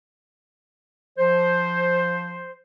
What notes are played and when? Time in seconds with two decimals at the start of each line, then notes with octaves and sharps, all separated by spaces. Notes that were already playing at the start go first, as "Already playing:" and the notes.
1.18 F3 C5